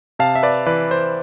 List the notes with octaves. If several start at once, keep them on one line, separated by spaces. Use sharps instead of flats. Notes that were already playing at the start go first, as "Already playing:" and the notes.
C3 F5 A5
E5
B4 D5
E3 B4 D5
C5